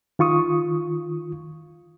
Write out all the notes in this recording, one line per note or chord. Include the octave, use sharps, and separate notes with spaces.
D#3 F4 C#6 D#6